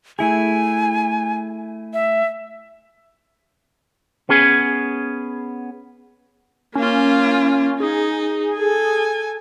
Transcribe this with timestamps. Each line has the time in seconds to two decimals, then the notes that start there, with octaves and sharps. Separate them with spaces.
0.19 A3 E4 G#4 G#5
1.93 E5
4.29 B3 C#4 G#4 G#5
6.75 A#3 C#4 F4
7.80 D#4 G#4
8.55 A4 G#5